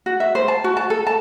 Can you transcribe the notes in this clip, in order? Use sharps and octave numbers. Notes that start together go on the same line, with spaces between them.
F#4
E5
C5
A5
F#4
A5
A4
A5